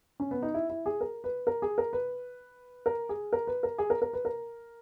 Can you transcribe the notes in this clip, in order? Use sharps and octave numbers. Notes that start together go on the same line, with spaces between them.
C#4
B3
D#4
E4
E4
G#4
A#4
B4
A#4
G#4
A#4
B4
A#4
G#4
A#4
B4
A#4
G#4
A#4
A#4
B4
A#4